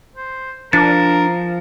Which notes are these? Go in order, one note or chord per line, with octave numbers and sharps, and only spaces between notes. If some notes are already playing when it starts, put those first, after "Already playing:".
C5
F3 D4 A#4 A6